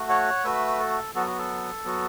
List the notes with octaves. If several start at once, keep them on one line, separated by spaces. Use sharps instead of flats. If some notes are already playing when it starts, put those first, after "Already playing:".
Already playing: A3 F#4
C#5 F#5
A3 F#4 B4 E5
A4
F#3 B3 F#4 A4
F#4
A4
F#3 B3 F#4